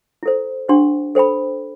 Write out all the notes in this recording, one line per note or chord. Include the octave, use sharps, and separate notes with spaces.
E4 A4 C5
D4 G4 C5 F#5 C6
A4 C5 G5 B5